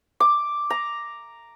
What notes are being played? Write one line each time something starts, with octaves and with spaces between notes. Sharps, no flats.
D6
A#5